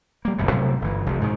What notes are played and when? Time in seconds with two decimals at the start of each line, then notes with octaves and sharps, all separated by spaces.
0.25 G3 A#3
0.38 G1 C2 F#2 A2
0.51 A2 C3 F#3 G3
0.82 G1 E3
1.06 F1 C2 F2
1.21 G#2 B2 D#3